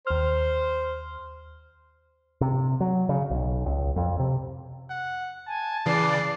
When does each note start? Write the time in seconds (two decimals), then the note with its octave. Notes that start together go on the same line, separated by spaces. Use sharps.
0.07 D#2 C5 F6
2.41 C3
2.80 F#3
3.09 C#3
3.30 B1
3.66 C#2
3.96 F2
4.19 C3
4.90 F#5
5.48 G#5 A5
5.86 C#3 E3 D5 C7